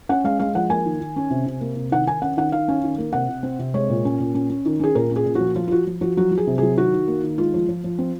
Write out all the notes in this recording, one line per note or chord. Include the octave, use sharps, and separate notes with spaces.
C#4 F#5
G#3 F5
G#3 F5
F3 F#5
A#3 G#5
D#3
D#3
C#4
C3
C3
A#3
C3
D#3 F#5
D#3 G#5
C#4 F#5
D#3 F#5
D#3 F5
C#4
D#3
A#3
C3 F#5
C3
C4
C3
G#3 C#5
A#2
C#4
A#2
C#4
C#4
D#3
C#4 G#4
A#2 A#4
C#4
G#4
A#2
F#4
F3
F3 F4
F4
F3 F#4
F3
F3 F#4
F#3 F#4
F#3
G#4
C3
F#3 G#4
D#3 F#4
D#3
A#3
D#3
G#3 F4
F3
F3
F3
C4